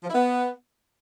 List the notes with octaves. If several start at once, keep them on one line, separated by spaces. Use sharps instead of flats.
F3
E4
B3